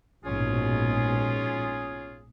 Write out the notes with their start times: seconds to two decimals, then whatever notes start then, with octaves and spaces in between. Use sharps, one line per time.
0.24 A#1 G#2 B2 C#4 F4 G#4